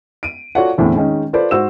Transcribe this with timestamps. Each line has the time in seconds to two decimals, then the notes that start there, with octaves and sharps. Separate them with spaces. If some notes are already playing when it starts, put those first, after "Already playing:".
0.23 D7 D#7
0.55 F4 F#4 A4 C#5 D5 F#5
0.78 E2 A2 D3 A3 C4
0.96 D#3 G#3 C#4 D#4
1.33 F4 A4 B4 C5 D5
1.51 G#2 F#4 C5 E6 E7